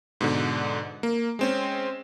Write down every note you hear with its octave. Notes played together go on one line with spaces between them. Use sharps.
G#2 B2 D3
A#3
G#3 C4 C#4